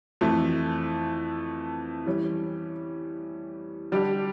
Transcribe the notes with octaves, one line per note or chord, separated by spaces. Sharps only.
F2 E3 A3
E3 G3 C#4
D3 G3 D4 G4